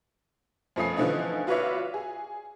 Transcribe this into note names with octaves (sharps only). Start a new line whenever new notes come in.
F2 F3 A3 C#4 D#6 C7
D3 E3 F3 A3 C#4 D#4
F4 F#4 B4 C#5 D5 E5
G#4